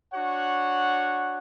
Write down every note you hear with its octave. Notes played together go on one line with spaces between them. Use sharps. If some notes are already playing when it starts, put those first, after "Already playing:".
D4 F#4 C#5 F#5